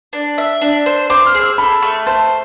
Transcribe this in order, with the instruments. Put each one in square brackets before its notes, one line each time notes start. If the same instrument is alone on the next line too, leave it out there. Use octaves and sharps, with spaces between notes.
[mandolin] D4
E5
D4
C5
[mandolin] C5 [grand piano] D6
[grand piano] F6
[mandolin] G#4
[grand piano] E6
[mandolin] A4 [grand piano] B5
[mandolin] A3
[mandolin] C5 [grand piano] A5